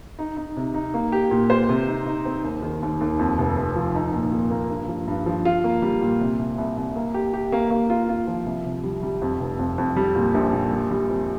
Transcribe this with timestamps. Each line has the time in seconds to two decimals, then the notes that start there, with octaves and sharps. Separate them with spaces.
0.19 D#4
0.37 D#4
0.57 C3
0.74 D#4
0.94 A#3
1.12 G4
1.31 A#2
1.50 C5
1.69 C3
1.88 D#4
2.06 D#4
2.25 C4
2.44 D#2
2.62 D#3
2.82 D#2
3.01 D#2
3.19 F2
3.38 F1
3.57 F1
3.76 F3
3.95 D#4
4.13 A#2
4.32 A#2
4.51 A#3
4.70 G2
4.88 F3
5.08 G2
5.26 F3
5.45 F4
5.64 A#3
5.82 G3
6.02 A#2
6.20 C3
6.39 C2
6.58 C2
6.77 C2
6.96 A#3
7.14 G4
7.34 G4
7.52 A#3
7.70 A#3
7.90 F4
8.09 F4
8.27 F3
8.46 C2
8.66 C3
8.84 G3
9.03 G3
9.22 F2
9.40 F1
9.59 F2
9.78 F2
9.96 G3
10.15 A#2
10.34 A#1
10.53 A#2
10.72 G3
10.90 G3
11.10 F2